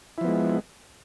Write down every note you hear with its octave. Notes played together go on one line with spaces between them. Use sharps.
F3 G#3 B3 E4